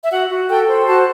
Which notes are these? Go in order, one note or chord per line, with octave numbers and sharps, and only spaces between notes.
E5
F#4 F#5
F#4
A4 G5
C5
F#4 A5